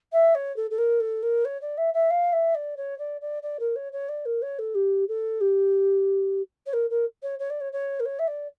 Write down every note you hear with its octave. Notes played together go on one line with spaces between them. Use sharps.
E5
C#5
A4
A4
A#4
A4
A#4
C#5
D5
E5
E5
F5
E5
D5
C#5
D5
D5
D5
A#4
C#5
C#5
D5
A#4
C#5
A4
G4
A4
G4
C#5
A#4
A#4
C#5
C#5
D5
C#5
C#5
A#4
C#5
E5
D5